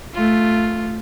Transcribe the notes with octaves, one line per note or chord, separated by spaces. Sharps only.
A3 F4